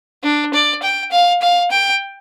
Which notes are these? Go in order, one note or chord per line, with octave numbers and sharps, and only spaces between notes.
D4
D5
G5
F5
F5
G5